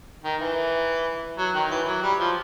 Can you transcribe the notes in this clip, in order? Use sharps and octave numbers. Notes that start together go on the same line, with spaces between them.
D#3
E3
F#3
D#3
E3
F#3
G3
F3